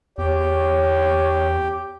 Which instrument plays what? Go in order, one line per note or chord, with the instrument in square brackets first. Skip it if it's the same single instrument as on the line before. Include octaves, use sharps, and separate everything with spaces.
[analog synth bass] E2 [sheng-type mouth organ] G4 [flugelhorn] C#5